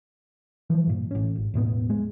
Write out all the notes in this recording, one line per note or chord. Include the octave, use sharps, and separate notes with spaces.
E3 F3 G3
G2 A#2
A1 C#4
G#1
E1 A2 G3 B3
G#3